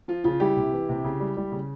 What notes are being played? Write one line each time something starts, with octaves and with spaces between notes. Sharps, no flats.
F3 F4
C#3 F4
G3 E4 G4
C3
E3
C3
C#3
G3
G3
C#3